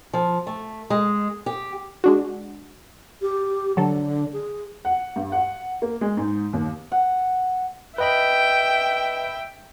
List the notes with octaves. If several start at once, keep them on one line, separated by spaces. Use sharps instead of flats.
F3
A3
G#3
G4
G#3 D4 F#4
G4
D3 F#3 A4
G#4
F#5
G2
F#5
A#3
G#3
G#2
D#2
F#5
B4 D#5 E5 G5 B5